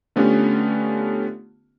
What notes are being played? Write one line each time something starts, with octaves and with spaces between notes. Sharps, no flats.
D3 A3 B3 C#4 F4 G4